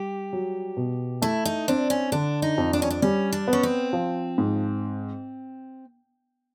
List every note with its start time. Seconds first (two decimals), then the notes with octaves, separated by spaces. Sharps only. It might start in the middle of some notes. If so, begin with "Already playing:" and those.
Already playing: G3 G4
0.33 F#3
0.77 B2
1.22 A3 E4
1.45 D#4
1.68 C4 D4
1.90 C#4
2.12 D3 D4
2.42 D#4
2.58 F2
2.73 D4
2.82 C#4
2.90 D4
3.02 G3 C#4
3.32 D4
3.48 B3
3.53 C#4
3.63 C4
3.93 F3
4.38 G#2